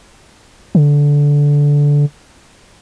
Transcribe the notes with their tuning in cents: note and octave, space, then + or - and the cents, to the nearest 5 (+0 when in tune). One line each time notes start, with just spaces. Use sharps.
D3 -15